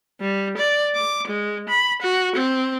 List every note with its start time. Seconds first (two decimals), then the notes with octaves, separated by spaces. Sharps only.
0.21 G3
0.57 D5
0.95 D6
1.27 G#3
1.69 B5
2.02 F#4
2.36 C4